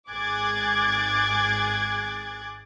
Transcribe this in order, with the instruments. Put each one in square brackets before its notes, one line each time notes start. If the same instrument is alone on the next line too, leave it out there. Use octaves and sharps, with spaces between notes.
[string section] G#1 G#4 D6 F#6 G#6 A6